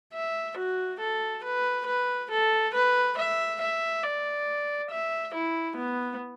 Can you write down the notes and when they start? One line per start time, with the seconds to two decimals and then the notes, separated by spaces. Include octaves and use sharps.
0.13 E5
0.57 F#4
1.00 A4
1.43 B4
1.86 B4
2.30 A4
2.73 B4
3.17 E5
3.61 E5
4.03 D5
4.90 E5
5.34 E4
5.77 B3